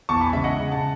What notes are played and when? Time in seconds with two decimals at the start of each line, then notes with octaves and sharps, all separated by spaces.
0.09 E2 A5 C#6
0.21 G#5 B5
0.33 C#3 G#3 E5
0.44 D#5 F#5
0.56 C#3
0.72 F#5 A5